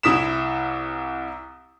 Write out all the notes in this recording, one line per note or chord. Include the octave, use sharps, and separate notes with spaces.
C2 E4 D#6 B6 E7